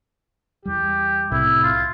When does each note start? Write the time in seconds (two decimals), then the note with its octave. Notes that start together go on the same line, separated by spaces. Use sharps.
0.65 E2 G3 G4
1.32 C2 A2 C3 E4
1.63 F4